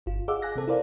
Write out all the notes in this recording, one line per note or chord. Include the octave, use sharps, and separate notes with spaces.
G1 F4
G#4 D#5 F5 F#5 D6 E6
G#5 F#6 A#6
C3 C4 A4
E4 F4 A#4 C5 D5 F5